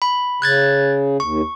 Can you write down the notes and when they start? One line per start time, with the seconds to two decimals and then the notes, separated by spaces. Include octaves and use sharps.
0.02 B5
0.42 C#3 F#6 G#6 A6
1.20 D#2 C#6